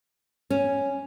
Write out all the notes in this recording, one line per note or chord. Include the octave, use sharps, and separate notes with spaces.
C#4